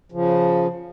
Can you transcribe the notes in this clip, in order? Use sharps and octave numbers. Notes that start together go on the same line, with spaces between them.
C#3 F3